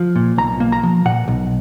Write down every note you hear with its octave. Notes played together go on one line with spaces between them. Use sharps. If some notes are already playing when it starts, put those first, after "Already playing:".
Already playing: F3
A#2
B1 A#5
A#3
A#5
F3
A#2 F#5
B1